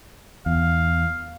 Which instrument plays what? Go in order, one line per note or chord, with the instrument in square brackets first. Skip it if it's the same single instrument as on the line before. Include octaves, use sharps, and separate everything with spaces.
[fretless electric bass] E2 [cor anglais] F5